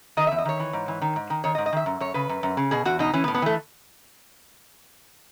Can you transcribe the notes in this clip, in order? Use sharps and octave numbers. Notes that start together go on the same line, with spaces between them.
D#3 D#5
E5
E2
D#5
D#3 C#5
E3
G#2
E3
D#3
G#2
D#3
D#3 C#5
D#5
G#2
D#5
D#3 E5
F#2
F#2 C#5
C#3 B4
F#2
F#2
C#3
B2 G#4
E2 F#4
B2 D#4
E3 C#4
B3
A2
B3
E3 A3